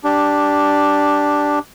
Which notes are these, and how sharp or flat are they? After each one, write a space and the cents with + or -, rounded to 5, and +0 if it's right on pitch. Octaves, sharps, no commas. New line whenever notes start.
D4 +0 G4 +0